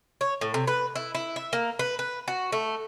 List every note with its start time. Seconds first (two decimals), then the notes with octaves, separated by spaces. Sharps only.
0.21 C#5
0.41 A2
0.54 C3
0.68 B4
0.96 E4
1.15 E4
1.36 E5
1.53 A#3
1.79 B4
1.99 B4
2.28 F#4
2.52 A3